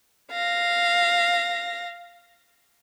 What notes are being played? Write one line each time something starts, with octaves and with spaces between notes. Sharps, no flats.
F5 A#6